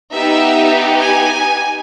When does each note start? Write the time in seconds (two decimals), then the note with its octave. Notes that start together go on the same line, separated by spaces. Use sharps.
0.12 B3 D#4 G4 E5
1.02 G#5